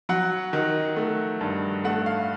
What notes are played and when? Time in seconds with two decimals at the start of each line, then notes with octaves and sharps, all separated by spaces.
0.09 F#3 F#5
0.53 D#3
0.96 A3
1.41 G2
1.84 A3 F#5
2.06 F5